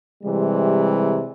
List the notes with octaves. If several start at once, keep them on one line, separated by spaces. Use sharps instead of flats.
C3 E3 G3 G#3